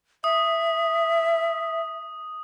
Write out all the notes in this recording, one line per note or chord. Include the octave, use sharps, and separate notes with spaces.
E5 D#6